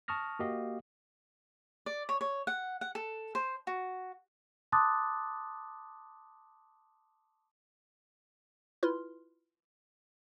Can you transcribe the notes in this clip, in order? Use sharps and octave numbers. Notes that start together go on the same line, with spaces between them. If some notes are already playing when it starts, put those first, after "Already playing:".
A5 C#6 D#6 F6 A#6
A#3 F#4 G4 D#5 F5
D5
C#5
C#5
F#5
F#5
A4
C5
F#4
A5 C6 D6 D#6 F#6 A6
E4 F4 B4 C6 F6